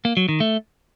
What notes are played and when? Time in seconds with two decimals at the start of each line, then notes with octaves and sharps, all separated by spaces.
0.05 A#3
0.17 F#3
0.29 D#3
0.40 A3